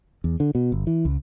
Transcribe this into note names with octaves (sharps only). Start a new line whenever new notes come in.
E2
D3
B2
G1
E3
C#2